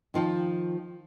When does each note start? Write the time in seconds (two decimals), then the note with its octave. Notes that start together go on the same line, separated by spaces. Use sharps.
0.14 D#3 F3 F4 G5